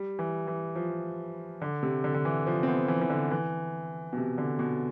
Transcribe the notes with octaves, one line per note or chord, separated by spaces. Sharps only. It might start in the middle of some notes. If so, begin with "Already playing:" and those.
Already playing: G3
E3
E3
F3
D3
C3
D3
D3
E3
F3
C4
B3
E3
E3
D3
E3
B2
C3
D3
B2